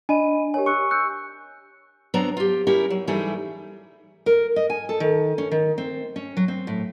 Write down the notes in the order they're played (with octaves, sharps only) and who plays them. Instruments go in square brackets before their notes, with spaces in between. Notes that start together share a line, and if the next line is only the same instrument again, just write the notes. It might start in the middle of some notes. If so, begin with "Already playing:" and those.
[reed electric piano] D4 [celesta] D#5 B5 D#7 [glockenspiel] G#5
[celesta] G4 A#4 C#5 [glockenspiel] G#5
[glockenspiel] C#6 [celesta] E6 F#6 C#7
[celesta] E6 G6 C#7 [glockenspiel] F#6
[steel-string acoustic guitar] F#3 B3 C4 D4 A#5
F4 G4
C#4 E4 G4 A#4
F#3
E3 G3 A3 D#4 E4 G#4
A#4
D#5
G#5
A4
D#3
C#4
D#3
C4
C#4
F#3
C4
A2